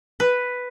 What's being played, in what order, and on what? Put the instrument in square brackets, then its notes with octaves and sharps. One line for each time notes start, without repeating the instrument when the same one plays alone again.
[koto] B4